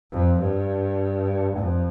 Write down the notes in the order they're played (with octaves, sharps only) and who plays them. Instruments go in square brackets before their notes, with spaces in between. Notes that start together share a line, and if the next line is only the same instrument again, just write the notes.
[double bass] F2
G2
F2